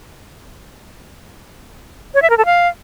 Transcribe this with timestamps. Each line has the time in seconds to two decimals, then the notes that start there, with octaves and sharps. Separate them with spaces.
2.14 C#5
2.22 E5
2.30 A#4
2.38 A4
2.45 F5